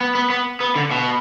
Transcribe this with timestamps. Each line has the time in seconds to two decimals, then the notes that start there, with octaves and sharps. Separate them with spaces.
0.01 B3
0.15 B3
0.30 B3
0.60 B3
0.76 D3
0.91 B2